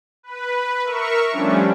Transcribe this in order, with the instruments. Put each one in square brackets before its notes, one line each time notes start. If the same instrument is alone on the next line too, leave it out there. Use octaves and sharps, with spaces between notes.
[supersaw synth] B4
A#4 E5 C#6
F3 G3 A3 C#4 D4